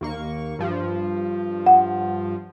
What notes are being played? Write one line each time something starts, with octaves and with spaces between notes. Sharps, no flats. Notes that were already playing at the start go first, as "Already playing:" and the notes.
D#2 A#3 C#6
G2 F3
F#5